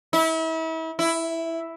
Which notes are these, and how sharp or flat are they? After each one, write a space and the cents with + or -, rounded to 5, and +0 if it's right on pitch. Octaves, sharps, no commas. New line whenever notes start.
E4 -35
E4 +0